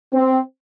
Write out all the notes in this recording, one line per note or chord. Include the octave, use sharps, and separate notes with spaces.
C4